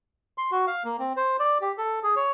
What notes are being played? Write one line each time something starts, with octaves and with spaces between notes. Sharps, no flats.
C6
F#4
F5
A#3
C4
C5
D5
G4
A4
G#4
C#5